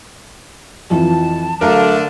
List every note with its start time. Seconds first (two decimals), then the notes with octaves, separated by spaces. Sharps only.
0.90 F2 E3 F3 A5
1.61 D3 F#3 A3 D4 A#4 F5